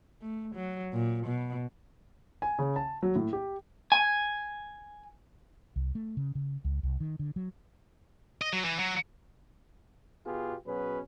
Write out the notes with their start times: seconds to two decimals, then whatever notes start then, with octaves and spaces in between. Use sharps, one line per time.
0.22 A3
0.55 F#3
0.93 A#2
1.26 B2
2.42 G#5
2.59 C#3
2.76 A5
3.03 F#3
3.16 A2
3.33 G4
3.92 G#5
5.76 C2
5.95 A3
6.17 C#3
6.35 C#3
6.64 C#2
6.83 C2
7.00 D#3
7.19 D3
7.36 F#3
8.41 D#5
8.53 F#3
8.65 E3
8.79 F#3
10.25 B2 B3 F4 G4 G#4
10.66 B2 F#3 C#4 G#4 B4